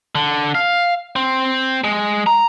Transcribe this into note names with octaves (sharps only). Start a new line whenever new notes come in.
D3
F5
C4
G#3
A#5